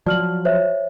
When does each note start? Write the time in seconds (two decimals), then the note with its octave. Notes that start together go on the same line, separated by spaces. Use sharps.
0.06 F3 F#3 D5 F6 F#7
0.45 C5 C#5 E5